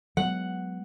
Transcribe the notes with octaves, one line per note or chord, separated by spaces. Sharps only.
F#3 G#3 B3 F#5